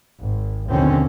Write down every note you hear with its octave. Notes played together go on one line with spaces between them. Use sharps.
G#1
D#2 B2 D3 F3 C4 C#4